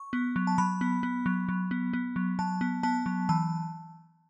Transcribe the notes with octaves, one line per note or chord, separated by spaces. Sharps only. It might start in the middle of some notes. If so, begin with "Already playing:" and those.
Already playing: C#6
B3
F#3
A5
F#3 B5
B3
B3
F#3
F#3
B3
B3
F#3
F#3 A5
B3
B3 A5
F#3
E3 A5